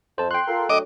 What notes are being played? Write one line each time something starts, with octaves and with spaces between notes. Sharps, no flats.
F2 C5 A5
G5 C6 F#6
F4 A4 A#4
D2 F#3 D#5 D6